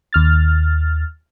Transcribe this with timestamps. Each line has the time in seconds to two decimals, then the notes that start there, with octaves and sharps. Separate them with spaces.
0.13 D#2 F6 A6